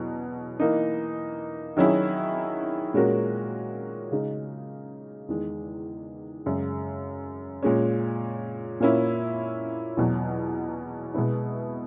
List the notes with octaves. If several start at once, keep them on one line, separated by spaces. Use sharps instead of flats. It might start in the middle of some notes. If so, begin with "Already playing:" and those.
Already playing: E2 B2 F#3
E3 A#3 D#4
D#3 F#3 C#4 E4 G#4
A#2 G#3 C#4 F#4 A#4
C#3 G#3 D#4
E2 D#3 G#3
F#2 C#3 G#3
A#2 G#3 C#4
A#2 A#3 C#4 E4
E2 B2 F#3
B2 G#3 B3 E4